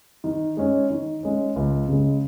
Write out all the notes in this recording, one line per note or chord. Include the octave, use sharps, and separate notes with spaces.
D#3
G#3 C#4
D#3
G#3 C#4
C#2
C#3 G#3